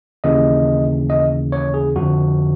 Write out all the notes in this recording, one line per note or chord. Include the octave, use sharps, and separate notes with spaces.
D#2 C#3 E3 D#5
D#5
C#5
G#4
F2 D3 F3 F#4